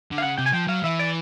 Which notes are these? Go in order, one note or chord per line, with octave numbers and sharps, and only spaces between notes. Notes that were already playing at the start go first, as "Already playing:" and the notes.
D3
F5
C#3 F#5
C3 G5
G#5
F3 G5
F#3 F5
E3 E5
D5